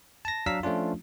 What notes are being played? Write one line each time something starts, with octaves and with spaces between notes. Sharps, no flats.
A5 A#6
F#3 D4 F5 A#5 E6 B6
F3 A3 C#4 D4 F4